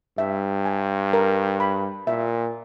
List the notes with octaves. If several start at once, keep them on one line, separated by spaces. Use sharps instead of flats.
G2 E5
G#5
A#4
B5
A#2 E5